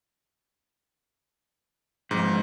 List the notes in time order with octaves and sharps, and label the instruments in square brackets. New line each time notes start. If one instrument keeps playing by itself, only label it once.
[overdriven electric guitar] B1 F2 [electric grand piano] G#2